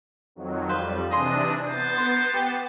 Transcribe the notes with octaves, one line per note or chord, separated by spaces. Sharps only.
F2 D#3 F#3
F2 G3 B4 C5 F5
C3 E3 D4 D#4 G#4 D#5 C6
B3 C5 A6
A#4 A#5 C6
G4 G5